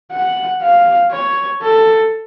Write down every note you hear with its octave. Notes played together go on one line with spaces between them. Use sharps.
F#5
F5
C#5
A4